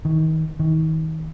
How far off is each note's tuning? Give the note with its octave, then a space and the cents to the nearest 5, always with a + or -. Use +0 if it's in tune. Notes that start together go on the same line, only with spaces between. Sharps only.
D#3 +30
D#3 +35